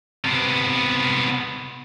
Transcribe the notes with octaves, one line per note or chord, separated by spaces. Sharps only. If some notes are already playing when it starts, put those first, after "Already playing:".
C3 B3